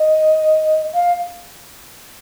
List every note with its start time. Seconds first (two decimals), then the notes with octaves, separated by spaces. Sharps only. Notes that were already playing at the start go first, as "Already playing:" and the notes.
Already playing: D#5
0.94 F5